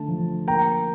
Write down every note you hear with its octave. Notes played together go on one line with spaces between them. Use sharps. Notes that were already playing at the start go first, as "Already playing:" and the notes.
Already playing: D3 A3 A5
F3
A#3 G5 A#5